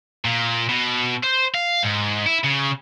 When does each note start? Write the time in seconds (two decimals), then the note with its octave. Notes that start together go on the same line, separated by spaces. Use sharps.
0.25 A#2
0.69 B2
1.23 C5
1.54 F5
1.83 G#2
2.26 E4
2.44 C#3